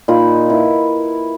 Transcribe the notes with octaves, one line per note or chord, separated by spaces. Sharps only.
A#2 D#4 F4 B5
E4 B4